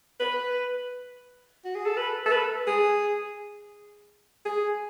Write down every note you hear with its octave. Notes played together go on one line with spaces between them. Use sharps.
B4
F#4
G#4
A4
B4
A4
B4
G#4
G#4